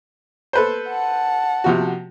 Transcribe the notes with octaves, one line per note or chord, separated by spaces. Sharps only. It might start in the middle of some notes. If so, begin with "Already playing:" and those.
A4 B4 C5
F#5 A5
C3 F3 F#4